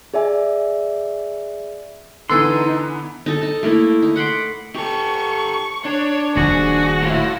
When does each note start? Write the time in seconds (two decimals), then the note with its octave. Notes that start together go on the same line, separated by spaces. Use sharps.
0.14 G#4 D5 E5 G#5
2.30 D3 E3 B3 D#4 A4 G#5 C6
3.26 D#4 A4
3.41 D#4 A5
3.63 A3 A#3 D#4 E4
4.02 D#4
4.16 F#5 B5 C6 D6
4.76 G4 A4 C#6
5.85 D4 C#5
6.37 D#1 D#3 F3 F#4 G#4
7.02 A2 E4 F4